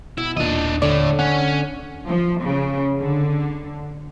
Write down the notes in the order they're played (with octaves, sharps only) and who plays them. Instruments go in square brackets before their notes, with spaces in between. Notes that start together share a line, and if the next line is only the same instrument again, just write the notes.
[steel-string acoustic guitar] B2 [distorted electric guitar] E4
[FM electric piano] D#2 A#2 [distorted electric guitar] D4 D#5
[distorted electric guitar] A2 A3 [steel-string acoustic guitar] D3 C#5 [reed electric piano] D5
[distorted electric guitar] C#4 [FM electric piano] F#5
[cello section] F3
C#3
D3